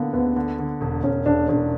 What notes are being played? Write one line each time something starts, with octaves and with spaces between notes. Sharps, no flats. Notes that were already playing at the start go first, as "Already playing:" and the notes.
Already playing: D3 A#3 B3
D2 B3
D3
D3
E1
E1 C#4
E1 D4
E1 D4